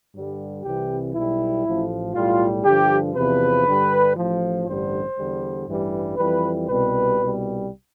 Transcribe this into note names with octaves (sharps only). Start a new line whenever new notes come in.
G2 D3 G3
C2 C3 E3 G3 G4
B1 B2 G3 E4
A1 A2 F3
B1 A2 G3 F4
G2 D3 F3 G4
E2 C3 F3 B4
G2 D3 G3
A1 A2 F3
A1 G2 D3 G3 C5
E2 D3 G3
A1 G2 E3 G3
F2 E3 G3 B4
C2 B2 G3 B4
C2 B2 G3